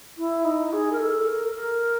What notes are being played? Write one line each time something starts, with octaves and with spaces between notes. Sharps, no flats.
E4
D#4
G#4
A#4
A4
A#4
A#4